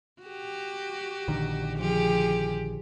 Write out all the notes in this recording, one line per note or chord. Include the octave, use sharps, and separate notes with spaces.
F#4 G4
A#1 D3 D#3
F3 G4 G#4